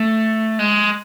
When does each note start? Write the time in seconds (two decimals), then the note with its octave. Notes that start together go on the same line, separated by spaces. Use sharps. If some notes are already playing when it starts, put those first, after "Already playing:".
Already playing: A3
0.59 G#3